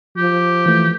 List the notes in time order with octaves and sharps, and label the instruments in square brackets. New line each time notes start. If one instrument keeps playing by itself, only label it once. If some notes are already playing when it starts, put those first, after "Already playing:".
[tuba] F3 [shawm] G4
[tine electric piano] E3 A3